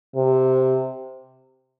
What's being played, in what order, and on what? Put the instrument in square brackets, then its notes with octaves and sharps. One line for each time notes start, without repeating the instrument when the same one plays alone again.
[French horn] C3